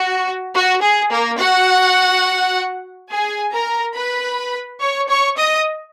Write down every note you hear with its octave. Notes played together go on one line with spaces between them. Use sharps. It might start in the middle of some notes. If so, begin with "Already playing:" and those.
Already playing: F#4
F#4
G#4
A#3 A#4
F#4 F#5
G#4 G#5
A#4 A#5
B4 B5
C#5 C#6
C#5 C#6
D#5 D#6